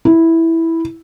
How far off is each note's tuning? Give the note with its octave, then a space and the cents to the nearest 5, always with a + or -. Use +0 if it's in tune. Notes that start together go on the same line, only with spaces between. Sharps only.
E4 -5